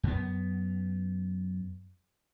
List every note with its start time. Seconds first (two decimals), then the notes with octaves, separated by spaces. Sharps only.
0.03 F#2 B3